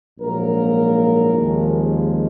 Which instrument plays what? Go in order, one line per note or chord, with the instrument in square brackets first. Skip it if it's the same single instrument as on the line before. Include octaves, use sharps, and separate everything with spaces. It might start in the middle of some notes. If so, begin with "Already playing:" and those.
[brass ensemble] A#1 G#2 F#3 A#3 A#4
D#2 C#3 F3 G#3